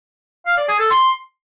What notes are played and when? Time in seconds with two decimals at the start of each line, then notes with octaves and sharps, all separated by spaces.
0.46 F5
0.57 D5
0.68 G#4
0.79 A4
0.90 C6